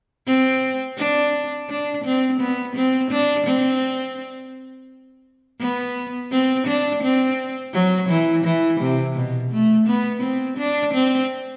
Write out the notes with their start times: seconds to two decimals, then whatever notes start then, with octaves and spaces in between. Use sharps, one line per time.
0.27 C4
0.98 D4
1.69 D4
2.05 C4
2.40 B3
2.76 C4
3.11 D4
3.47 C4
5.60 B3
6.32 C4
6.67 D4
7.03 C4
7.73 F#3
8.09 E3
8.44 E3
8.80 C3
9.16 B2
9.51 A3
9.87 B3
10.22 C4
10.58 D4
10.94 C4